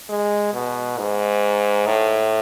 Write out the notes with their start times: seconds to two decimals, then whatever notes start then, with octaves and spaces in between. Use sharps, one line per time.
0.09 G#3
0.53 B2
0.98 G#2
1.86 A2